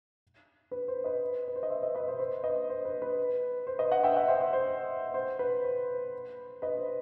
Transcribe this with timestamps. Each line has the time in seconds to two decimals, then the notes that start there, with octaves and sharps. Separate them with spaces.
0.71 B4
0.88 C5
1.04 B4 D#5
1.48 B4
1.56 C5
1.63 D#5
1.70 C5 E5
1.82 B4 D#5
1.95 B4 D#5
2.08 C5
2.19 C5
2.44 B4 D#5
2.69 C5
2.85 B4
3.02 B4
3.67 C5
3.79 B4 D#5
3.92 D#5 F#5
4.04 E5 G5
4.17 D#5 F#5
4.28 C5 E5
4.41 C5
4.53 C5
5.14 C5
5.39 B4
5.65 C5
6.62 B4 D#5
6.79 C5